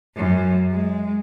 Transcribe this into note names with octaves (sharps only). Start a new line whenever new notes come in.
F#2
G#3